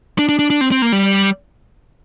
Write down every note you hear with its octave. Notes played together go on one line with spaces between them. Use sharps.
D4
D4
D4
D4
C4
C4
A#3
G3